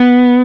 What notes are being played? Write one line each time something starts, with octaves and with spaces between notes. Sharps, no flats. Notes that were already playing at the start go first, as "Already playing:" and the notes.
Already playing: B3